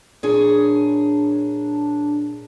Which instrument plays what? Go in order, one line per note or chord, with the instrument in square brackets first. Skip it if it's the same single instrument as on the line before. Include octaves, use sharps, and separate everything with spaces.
[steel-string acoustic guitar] A#2 G#4 C#5 [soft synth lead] D4